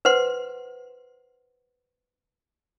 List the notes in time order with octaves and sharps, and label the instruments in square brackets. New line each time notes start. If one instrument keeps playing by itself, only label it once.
[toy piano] B4 C5 F#5 C6